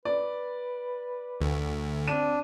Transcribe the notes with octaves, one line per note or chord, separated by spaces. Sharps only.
B4 D5
D2
C4 D4 D#7